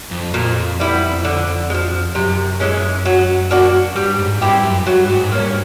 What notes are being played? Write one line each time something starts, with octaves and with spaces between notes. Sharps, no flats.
F2
F2 A#2
G3 B3 E4
D3
G#3
F3
F#2 C3
E3 G#3 C#4
F#3
A#3 D4 F#4
G2 G3
G#2
G2 C4 E4 G4
F#2
G2 F#3
G#2
G2 A#3 C#4